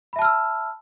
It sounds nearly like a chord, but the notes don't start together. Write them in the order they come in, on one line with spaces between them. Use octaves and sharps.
B5 E5 A5 F6 E6